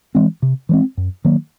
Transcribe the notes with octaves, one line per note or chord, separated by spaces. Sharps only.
E3 G#3 C4
C3
E3 G#3 C4
F#2
D#3 F#3 A#3